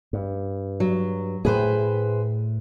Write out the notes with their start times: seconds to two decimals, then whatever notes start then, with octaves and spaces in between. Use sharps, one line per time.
0.13 G2
0.80 F#3
1.45 A2 A3 G#4 B4 C5